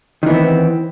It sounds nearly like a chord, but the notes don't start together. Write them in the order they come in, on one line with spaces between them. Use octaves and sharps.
D#3 E3 B3 C4